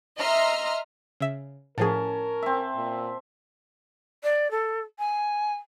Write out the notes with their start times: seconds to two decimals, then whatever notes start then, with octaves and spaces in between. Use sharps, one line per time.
0.19 D#5 E5 A#5 C6 F6
1.20 C#3 E5
1.78 A2 F3 C#4 G#4 A#4 A5
2.43 C4 E5
2.75 A#2
4.23 D5
4.51 A4
4.99 G#5